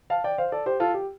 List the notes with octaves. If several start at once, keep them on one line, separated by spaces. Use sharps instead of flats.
F5 A5
D5 G5
C5 F5
A4 D5
G4 C5
F4 A4
G4